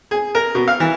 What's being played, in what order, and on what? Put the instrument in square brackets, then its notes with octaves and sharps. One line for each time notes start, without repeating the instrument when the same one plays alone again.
[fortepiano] G#4
A#4
B2
F5
E3